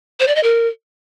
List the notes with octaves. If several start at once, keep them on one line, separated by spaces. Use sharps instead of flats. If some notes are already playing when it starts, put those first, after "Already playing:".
C5
D5
D#5
A#4